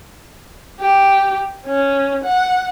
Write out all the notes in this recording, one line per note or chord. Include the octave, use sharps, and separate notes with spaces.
G4
C#4
F#5